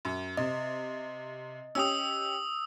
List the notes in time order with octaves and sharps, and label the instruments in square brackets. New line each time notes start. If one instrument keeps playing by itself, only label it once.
[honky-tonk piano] F#2
[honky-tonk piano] C3 [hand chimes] D#5
[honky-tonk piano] C#4 G4 F7 [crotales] D#6 E6